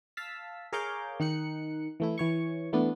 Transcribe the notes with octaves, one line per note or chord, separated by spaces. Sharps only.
F5 A5 E6 B6
G#4 A#4 C#5 F5 D6 G6
D#3 D#4 F#6 C#7
E3 A3 E4
E3 C#5 C#6
E3 A3 B3 D4